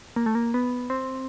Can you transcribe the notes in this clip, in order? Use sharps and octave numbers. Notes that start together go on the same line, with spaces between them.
A#3
A3
A#3
B3
C4